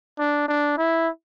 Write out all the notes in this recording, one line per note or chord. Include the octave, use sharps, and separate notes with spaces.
D4
D4
E4